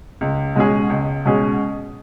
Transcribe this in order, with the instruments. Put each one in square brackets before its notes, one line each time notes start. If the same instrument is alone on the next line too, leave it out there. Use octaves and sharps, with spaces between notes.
[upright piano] C#2
B2 G#3 C#4 G#4
C#2
B2 G#3 C#4 G#4